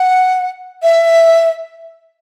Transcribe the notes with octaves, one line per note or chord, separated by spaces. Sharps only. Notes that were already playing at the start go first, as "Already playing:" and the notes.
Already playing: F#5
E5